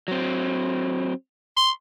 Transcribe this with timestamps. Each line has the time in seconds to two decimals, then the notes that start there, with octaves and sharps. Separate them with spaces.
0.08 F#3 C4
1.57 C6